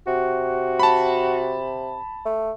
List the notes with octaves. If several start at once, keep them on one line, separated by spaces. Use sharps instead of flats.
C3 F#4
A5 B5
A3